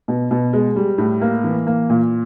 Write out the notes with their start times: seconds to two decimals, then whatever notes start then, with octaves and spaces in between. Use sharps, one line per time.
0.08 B2
0.31 B2
0.53 G#3
0.76 G3
0.98 A2
1.21 A#3
1.44 E3
1.67 A#3
1.90 A#2